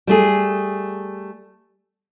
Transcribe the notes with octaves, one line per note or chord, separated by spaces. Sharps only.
G3 A3 G#4